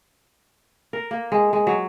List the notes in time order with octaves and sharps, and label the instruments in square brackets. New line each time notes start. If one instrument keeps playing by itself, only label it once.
[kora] A#4
A#3
G#3
G#3
F#3